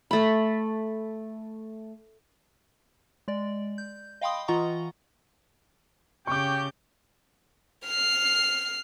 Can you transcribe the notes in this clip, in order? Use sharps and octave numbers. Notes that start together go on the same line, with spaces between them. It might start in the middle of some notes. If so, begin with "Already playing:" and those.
A3 B5
G#3 D5
G6
D#5 F5 G5 B5 C6 D#6
E3 F4 D#5 F#5 A#5 C#6
C#3 G4 G5 C#6 D6 G6
F6 C7